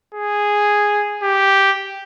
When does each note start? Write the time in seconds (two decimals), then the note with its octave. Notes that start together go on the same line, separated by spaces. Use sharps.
0.14 G#4
1.23 G4